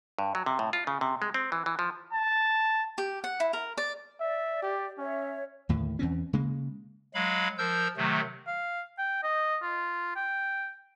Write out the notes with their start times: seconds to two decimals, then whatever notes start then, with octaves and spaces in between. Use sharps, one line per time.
0.19 G2
0.35 F#3
0.46 C3
0.59 A2
0.73 F4
0.87 C#3
1.01 C3
1.22 G#3
1.34 C4
1.52 E3
1.66 E3
1.79 F3
2.13 A5
2.98 G4
3.24 F#5
3.40 E4
3.53 A#4
3.77 D5
4.20 D5 E5
4.62 G4
4.98 C#4 C#5 E5
5.69 D#2 A2 D3
5.99 E2 E3 C4 C#4
6.33 C#3 G#3 A#3
7.14 F#3 G#3 F5 B5
7.58 F3 A#4 E6 G6
7.97 C3 D#3 F#3 A3
8.47 F5
8.99 G5
9.23 D#5
9.63 F4
10.16 G5